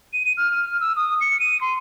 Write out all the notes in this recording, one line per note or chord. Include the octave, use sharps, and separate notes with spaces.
D#7
D#7
F6
E6
D#6
C#7
D#7
C6